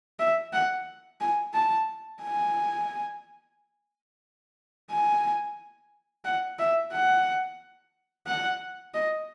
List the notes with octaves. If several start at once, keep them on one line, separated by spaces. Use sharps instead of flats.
E5
F#5
G#5
A5
G#5
G#5
F#5
E5
F#5
F#5
D#5